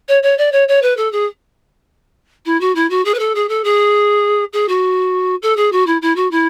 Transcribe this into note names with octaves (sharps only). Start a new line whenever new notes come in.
C#5
C#5
D5
C#5
C#5
B4
A4
G#4
E4
F#4
E4
F#4
G#4
B4
A4
G#4
A4
G#4
G#4
F#4
A4
G#4
F#4
E4
E4
F#4
E4